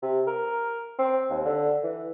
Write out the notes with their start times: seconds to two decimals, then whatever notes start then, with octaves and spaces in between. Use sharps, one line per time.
0.02 C3
0.27 A#4
0.99 C4
1.30 D#2
1.45 D3
1.83 E3